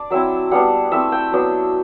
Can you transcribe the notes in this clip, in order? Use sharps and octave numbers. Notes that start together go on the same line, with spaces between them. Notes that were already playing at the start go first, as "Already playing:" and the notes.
Already playing: D4 D5
F#3 C4 E4 E5
G3 B3 D4 F#5
A3 C4 E4 E5
G5
F#3 B3 D4